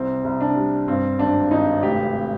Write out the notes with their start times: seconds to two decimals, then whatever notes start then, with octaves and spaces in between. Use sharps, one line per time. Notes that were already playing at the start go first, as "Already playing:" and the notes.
Already playing: C2 C4
0.24 C2
0.41 D4
0.56 G3
0.88 G2 C4
1.19 G#1 D4
1.51 G#1 D#4
1.83 F1 G4